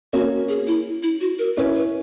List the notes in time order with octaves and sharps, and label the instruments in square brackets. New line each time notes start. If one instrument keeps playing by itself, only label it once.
[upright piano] A#3 C#4 [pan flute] F#4
[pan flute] G#4
E4
E4
F#4
A#4
[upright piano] C#4 E4 [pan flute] B4
[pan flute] B4